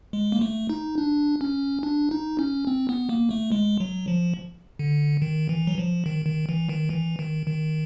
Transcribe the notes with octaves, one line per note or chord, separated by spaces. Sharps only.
G#3
A#3
A3
D#4
D4
C#4
D4
D#4
C#4
C4
B3
A#3
A3
G#3
F#3
F3
D3
D#3
E3
F#3
F3
D#3
D#3
E3
D#3
E3
D#3
D#3